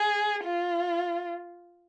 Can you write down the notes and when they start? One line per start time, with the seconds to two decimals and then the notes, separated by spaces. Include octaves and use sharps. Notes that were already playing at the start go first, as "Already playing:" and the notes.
Already playing: G#4
0.44 F4